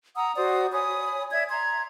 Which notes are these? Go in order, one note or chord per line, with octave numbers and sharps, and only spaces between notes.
F#5 A#5 D#6 E6
F#4 C5 D5 D#6
C#5 G#5 B5 D#6
D5 E5 G#6
A#5 C6 G#6